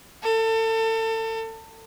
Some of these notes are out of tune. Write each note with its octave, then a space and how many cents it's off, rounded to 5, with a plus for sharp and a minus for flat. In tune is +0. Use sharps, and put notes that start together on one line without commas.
A4 +30